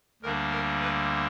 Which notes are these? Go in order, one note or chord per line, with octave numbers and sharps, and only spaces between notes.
D2 D3 G3 A#3 D4 A#4
A#4
B4